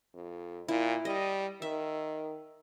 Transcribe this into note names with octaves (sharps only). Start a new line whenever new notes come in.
F2
A#2 E4
G3 D#5
D#3 E5